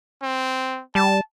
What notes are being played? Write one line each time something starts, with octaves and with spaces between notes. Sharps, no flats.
C4
G3 A5